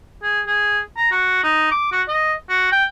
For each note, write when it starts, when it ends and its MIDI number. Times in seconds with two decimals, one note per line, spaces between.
0.23 0.41 68
0.47 0.79 68
0.97 1.09 82
1.11 1.39 66
1.43 1.68 63
1.71 1.89 86
1.92 2.02 66
2.08 2.33 75
2.49 2.71 66
2.72 2.85 79